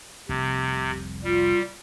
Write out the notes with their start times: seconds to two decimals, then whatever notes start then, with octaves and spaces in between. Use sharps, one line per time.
0.29 F1 C2 C3 C4
1.24 G3 F4